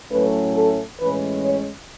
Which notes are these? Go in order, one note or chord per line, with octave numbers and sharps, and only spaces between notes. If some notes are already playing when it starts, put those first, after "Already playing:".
A2 F#3 A3 C#4 B4
A4
A2 E3 G#3 C#4 B4
C#5